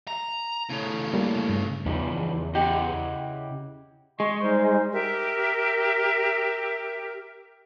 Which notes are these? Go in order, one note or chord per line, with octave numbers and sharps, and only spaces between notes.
A#5
A2 C#3
G3 A#3
G2
E2 C#3 F3 G3 D#4
E4 G4 D#5 F#5
G#3 D#5 C6 C#6
G3 D#4 C5
G4 A#4 E5